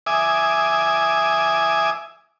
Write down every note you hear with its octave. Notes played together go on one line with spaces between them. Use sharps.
E5 G#5 D6 D#6